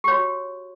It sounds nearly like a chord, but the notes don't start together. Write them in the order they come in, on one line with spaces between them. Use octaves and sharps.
G4 C#5 F#4